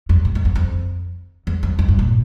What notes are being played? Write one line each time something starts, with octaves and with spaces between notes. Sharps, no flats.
F2
A2
F2
E2
F2
E2
F2
F2
G2
A#2